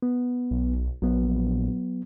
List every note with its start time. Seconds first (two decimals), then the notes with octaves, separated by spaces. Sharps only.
0.02 B3
0.51 B1
1.02 A#1 F#3 B3